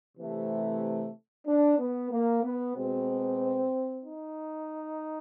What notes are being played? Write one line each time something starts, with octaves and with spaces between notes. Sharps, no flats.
C3 E3 A3
D4
B3
A#3
B3
B2 G#3 C4
D#4